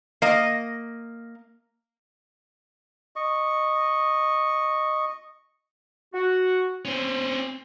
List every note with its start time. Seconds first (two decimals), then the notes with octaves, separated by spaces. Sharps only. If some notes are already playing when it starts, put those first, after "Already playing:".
0.22 A#3 D#5
3.16 D#5 C#6
6.14 F#4
6.85 C4 C#4